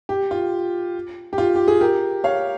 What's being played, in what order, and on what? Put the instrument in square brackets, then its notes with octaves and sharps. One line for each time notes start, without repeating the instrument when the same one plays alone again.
[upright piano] G4
F4
G4
F4
G4
G#4
G4 A#4
C#5 F5